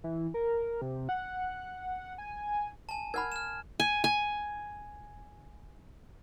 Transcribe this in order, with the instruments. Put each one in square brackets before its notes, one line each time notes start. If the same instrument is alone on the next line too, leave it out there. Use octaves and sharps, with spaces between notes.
[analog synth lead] E3
A#4
C3
F#5
G#5
[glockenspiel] G#5 A5
[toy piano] A#4 F#5 B5 [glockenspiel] F6 G#6
[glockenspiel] F6 E7
[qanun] G#5
G#5